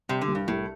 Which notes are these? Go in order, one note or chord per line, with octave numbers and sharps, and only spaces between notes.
C3 G3
D3
C2
G2
C2 A2